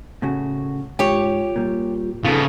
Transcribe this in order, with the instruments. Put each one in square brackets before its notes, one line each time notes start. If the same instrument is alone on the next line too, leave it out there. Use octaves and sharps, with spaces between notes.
[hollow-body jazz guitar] A2 C#3 F#4
[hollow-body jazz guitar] G#2 [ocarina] F4 [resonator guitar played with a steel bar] G4 C#5
[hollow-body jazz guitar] A#2 G3
[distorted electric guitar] C#3 B3 [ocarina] D#4 [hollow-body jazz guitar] F4 A4